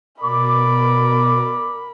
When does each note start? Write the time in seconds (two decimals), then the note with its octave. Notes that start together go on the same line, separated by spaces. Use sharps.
0.21 B2 A#4 D5 B5 D6